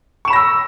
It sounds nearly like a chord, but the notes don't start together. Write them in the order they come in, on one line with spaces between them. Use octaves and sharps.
C#6 E7 B5 A#6 E6